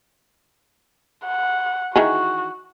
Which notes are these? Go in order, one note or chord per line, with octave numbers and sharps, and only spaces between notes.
F#5
D#3 E3 F#4 G#4